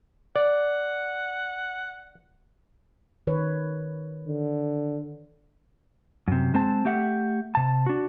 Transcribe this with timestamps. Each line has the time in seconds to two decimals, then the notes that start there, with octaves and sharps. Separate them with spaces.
0.36 D5 F#5
3.27 D#3 B4 C#5
4.27 D3
6.28 F#2 C3
6.54 G#3 C4 C5 A5
6.85 A3 G4 E5 F#5
7.55 C3 A5
7.86 D4 F#4